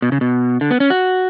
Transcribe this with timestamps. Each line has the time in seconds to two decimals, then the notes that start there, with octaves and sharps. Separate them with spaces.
0.02 B2
0.12 C#3
0.21 B2
0.61 D3
0.71 B3
0.80 C#4
0.90 F#4